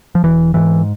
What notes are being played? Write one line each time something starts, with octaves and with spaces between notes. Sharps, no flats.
F3
E1 E3
G#2 E3